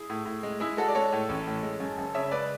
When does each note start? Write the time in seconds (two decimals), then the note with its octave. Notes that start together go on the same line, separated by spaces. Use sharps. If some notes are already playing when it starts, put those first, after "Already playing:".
Already playing: E4 G#4
0.10 A2
0.26 A2
0.43 G#3
0.60 G#3 E4 G#4
0.77 G#3 F#4 A4
0.88 D5
0.95 G#3 A4 C#5
1.13 A2
1.29 A1
1.47 A2
1.63 G#3
1.80 F#2
1.98 F#1
2.14 C#3 C#5 E5
2.31 G#3 B4 D5